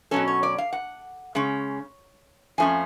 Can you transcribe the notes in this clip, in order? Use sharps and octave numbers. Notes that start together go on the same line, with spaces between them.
B2 F#3 C#4 A4
C#5
D5
F5
F#5
C#3 G#3 C#4
F2 F3 A3 C#4 G#5